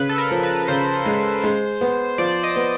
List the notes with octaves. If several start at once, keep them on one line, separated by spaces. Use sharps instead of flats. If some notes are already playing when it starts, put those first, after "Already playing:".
Already playing: C#3 B4
A4
A#4
F3
B4
C#3 C5
G#3
G#3
B3
F3 D5
D#5
B3